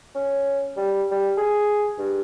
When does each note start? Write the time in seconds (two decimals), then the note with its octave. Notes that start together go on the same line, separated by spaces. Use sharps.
0.15 C#4
0.77 G3
1.11 G3
1.37 G#4
1.98 G2